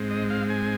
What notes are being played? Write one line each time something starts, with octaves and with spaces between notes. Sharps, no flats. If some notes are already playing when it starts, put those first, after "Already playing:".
Already playing: G#2 G#3 C4
D#5
F5
G#5